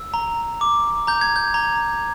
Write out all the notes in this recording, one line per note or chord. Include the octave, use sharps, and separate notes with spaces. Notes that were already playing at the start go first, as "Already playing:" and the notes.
Already playing: E6
A#5
D6
A#5 G6
G#6
G6
A#5